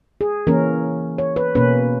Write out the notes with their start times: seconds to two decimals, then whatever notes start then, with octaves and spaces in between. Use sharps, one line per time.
0.21 G#4
0.47 E3 A#3 C#4 A#4
1.18 C#5
1.36 B4
1.55 B2 A#3 C#4 B4